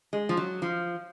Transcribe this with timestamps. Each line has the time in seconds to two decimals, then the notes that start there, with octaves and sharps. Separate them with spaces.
0.13 G#3
0.29 F3
0.37 F#3
0.62 F3